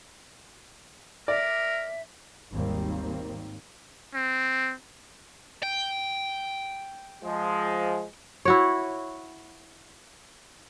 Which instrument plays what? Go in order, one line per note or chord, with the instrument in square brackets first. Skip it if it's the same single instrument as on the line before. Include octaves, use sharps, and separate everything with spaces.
[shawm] A#4 [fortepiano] D5 [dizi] E5
[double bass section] G#1 D#2 D#3 G3 A#3 C4
[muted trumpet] C4
[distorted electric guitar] G5
[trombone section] F3 G#3
[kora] E4 F#4 C#5